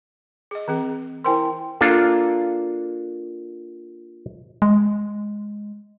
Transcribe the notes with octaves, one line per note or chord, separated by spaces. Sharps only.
G#4 D#5
E3 C4 G#4
E4 A#4 C5 G5 G#5 C6
A#3 D4 F4 A4
G#3